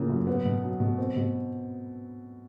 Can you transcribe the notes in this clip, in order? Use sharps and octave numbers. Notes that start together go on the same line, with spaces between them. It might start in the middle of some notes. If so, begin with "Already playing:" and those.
Already playing: A2 C#3 F3 A#3
F#2
B3
B2
F#3
B2
C4
B2